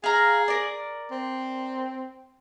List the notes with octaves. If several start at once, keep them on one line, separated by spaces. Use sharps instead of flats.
G#4 F5 A#5
A#4 D5
C4